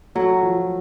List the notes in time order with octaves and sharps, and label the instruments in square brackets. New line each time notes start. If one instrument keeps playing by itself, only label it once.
[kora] F#3 [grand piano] A3
[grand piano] F3